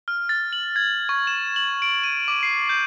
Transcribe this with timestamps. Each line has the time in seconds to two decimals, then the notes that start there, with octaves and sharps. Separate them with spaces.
0.08 F6
0.29 A6
0.53 F#7
0.76 G#6
1.09 C#6
1.27 E7
1.56 F#7
1.82 D7
2.03 D#7
2.28 D6
2.43 C7
2.69 G6